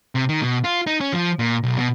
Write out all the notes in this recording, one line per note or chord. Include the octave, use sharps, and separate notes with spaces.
C3
D#3
B2
F4
D#4
C#4
F3
A#2
B1
B2